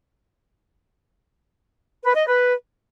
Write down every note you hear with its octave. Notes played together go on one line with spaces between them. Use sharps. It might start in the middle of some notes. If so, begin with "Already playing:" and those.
B4
D#5
B4